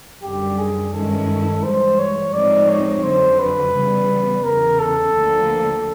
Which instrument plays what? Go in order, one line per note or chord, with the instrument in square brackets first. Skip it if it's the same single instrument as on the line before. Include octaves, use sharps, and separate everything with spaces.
[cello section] F#2 D3 G3 [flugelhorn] G4
[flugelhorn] G#4
[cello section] G2 D#3 G#3 C#4 E4 [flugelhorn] A4
[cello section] G#2 E3 G3 [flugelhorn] C5
[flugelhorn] C#5
[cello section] A2 F3 G#3 C4 D#4 [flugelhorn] D5
[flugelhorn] C#5
[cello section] F2 D3 F#3 [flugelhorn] C5
[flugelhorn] B4
[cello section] C#3 E3 G3 B3
[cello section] E2 C#3 E3 [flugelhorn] A#4
[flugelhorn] A4
[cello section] D2 D3 F3 A#3